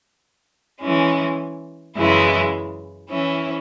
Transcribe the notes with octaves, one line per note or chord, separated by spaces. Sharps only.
E3 G#3 C#4
F#2 C#3 E3 G#3 E4
E3 C#4 E4